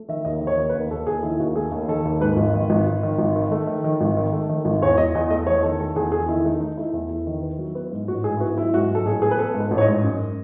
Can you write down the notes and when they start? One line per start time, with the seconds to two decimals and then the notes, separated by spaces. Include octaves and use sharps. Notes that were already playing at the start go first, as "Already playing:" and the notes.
Already playing: A3
0.09 D#3 E5
0.25 D#2 D#5
0.41 D#3
0.47 C#5
0.58 D#2
0.69 B4
0.75 D#2
0.90 D#2 A4
1.07 D#2 G#4
1.23 D#3 E4
1.40 D#2 F#4
1.55 A3 G#4
1.72 D#2
1.88 D#3 A4
2.05 D#2
2.20 G#2 B4
2.37 G#1
2.54 D#3
2.70 G#1
2.86 G#1
3.03 D#3
3.18 G#1
3.36 D#3
3.51 A3
3.67 D#3
3.84 D#3
4.01 G#1
4.17 D#3
4.32 A3
4.49 D#3
4.65 G#1
4.82 E2 C#5
4.98 E2 D#5
5.15 E2 D#5
5.30 A3 D#5
5.47 E2 C#5
5.63 D#3 A4
5.80 A3 A4
5.96 E2 G#4
6.12 E2 G#4
6.28 D#3 E4
6.45 A3 D#4
6.61 A3 D#4
6.77 A3 E4
6.93 E2
7.10 E2
7.27 D#3
7.42 B3
7.59 F#3
7.75 B3
7.92 G#2
8.08 A1 F#4
8.24 G#2 G#4
8.37 E4
8.40 B3 F#4
8.56 F#3 E4
8.74 G#2 F#4
8.90 F#3 A4
9.06 A1 G#4
9.22 B3 G#4
9.31 B4
9.39 B3 A4
9.54 G#2
9.60 B4
9.71 A1
9.78 C#5
9.81 D#5
9.87 G#2
10.03 F#2